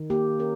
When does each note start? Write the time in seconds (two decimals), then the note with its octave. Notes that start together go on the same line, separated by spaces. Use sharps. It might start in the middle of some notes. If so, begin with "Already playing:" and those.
Already playing: D#3
0.10 A#3 G4
0.39 C#4 A#4